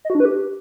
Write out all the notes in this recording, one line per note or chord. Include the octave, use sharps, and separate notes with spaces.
D#5
F#4
D4
B4
G4